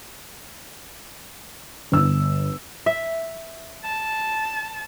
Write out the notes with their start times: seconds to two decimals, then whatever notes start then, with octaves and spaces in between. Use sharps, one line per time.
1.92 G1 E6
2.86 E5
3.84 A5